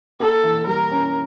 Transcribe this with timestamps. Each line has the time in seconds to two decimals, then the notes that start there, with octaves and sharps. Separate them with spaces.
0.20 A#3 A4
0.44 E3
0.67 G3 A#4
0.91 C#4